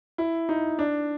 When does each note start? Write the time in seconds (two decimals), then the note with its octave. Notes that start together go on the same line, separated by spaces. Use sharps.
0.18 E4
0.49 D#4
0.79 D4